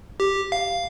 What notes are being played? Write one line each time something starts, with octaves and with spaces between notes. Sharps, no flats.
G4
F5